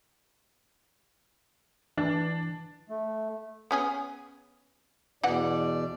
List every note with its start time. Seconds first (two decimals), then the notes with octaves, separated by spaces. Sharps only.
1.98 E3 D4
2.89 A3
3.71 B3 C#4 G#4
5.23 E2 B2 E3 D5 F#5